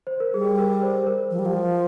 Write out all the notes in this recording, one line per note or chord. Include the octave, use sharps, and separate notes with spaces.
C5
A#4
G3 G#4
A#4
C5
A#4
F3
G3
F3